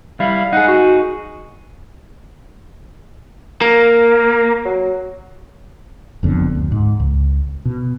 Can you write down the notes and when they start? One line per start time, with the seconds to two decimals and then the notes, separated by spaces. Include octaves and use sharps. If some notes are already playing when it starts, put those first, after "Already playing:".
0.20 G3 E4 F5
0.53 D#4 G#4 F#5
0.68 F#4
3.61 A#3 A#4
4.65 F#3
6.23 F#1 F2 D3 B3
6.55 D2
6.72 G#2
7.00 C#2
7.65 B2